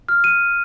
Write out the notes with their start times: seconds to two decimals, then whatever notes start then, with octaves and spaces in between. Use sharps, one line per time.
0.09 F6
0.24 D#7